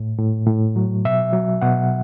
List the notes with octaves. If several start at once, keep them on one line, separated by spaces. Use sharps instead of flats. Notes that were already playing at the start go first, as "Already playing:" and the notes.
Already playing: A2
A2
A2
F#3
B2 E5
F#3
B2 F#5